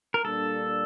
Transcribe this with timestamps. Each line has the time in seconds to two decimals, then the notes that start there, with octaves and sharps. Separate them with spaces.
0.14 A#4
0.25 A#2 G3 A#3 D4 A4